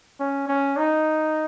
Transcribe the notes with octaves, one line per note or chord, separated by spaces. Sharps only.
C#4
C#4
D#4